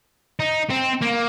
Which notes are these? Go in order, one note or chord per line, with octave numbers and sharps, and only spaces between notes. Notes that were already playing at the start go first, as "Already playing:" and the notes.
D#4
C4
A#3